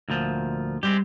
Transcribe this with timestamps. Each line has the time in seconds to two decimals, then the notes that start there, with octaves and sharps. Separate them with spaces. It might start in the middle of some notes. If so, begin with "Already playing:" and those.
0.09 D2 A#2 F3
0.83 G3 G#3 C4 G4